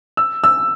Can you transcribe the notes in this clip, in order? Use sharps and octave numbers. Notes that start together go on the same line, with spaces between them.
E6
E6